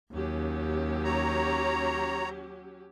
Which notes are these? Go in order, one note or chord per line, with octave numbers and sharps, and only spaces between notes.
D#2 F#3 C#4 G4
C#5 A#5